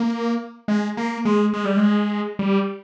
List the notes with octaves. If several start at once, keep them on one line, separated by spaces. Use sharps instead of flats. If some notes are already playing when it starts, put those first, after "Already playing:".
Already playing: A#3
G#3
A#3
G#3
G#3
G3
G#3
G3